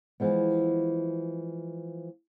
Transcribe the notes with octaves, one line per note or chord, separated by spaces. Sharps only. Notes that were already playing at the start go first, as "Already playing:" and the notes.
E3 F3 G#3 B3